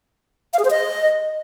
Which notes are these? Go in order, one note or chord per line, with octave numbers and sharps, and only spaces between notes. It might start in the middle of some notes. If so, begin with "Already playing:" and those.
F5
G#4
C5
D#5